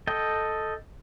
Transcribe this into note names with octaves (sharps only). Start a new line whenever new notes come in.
A4 D#5 G5